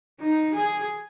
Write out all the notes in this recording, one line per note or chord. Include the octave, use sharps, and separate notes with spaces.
D#4
G#4